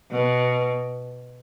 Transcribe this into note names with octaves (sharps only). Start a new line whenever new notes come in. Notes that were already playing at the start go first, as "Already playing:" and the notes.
B2